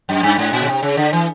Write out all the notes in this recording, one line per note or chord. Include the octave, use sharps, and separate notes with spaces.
F#2
G2
G#2
A#2
C#3
C3
C#3
D3
E3